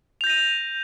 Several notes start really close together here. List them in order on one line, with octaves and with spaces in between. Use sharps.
F7 G6 A#6 D#7